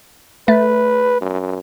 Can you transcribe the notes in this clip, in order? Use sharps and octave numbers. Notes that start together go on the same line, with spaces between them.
A3 B4
F#2